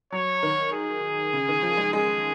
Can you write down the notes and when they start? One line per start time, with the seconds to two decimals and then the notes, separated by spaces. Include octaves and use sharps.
0.12 F#3 C#5
0.43 D#3
0.73 G#4
1.33 C#3
1.48 D#3
1.63 F3
1.77 G#3
1.93 G#3 G#4